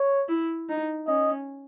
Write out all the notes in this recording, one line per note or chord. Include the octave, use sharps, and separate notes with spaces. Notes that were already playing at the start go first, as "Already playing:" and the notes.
Already playing: C#5
E4
D#4
C#4 D#5